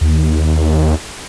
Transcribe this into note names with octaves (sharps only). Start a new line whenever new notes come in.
D#2